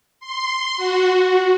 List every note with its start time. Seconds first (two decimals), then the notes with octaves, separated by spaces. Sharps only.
0.20 C6
0.77 F#4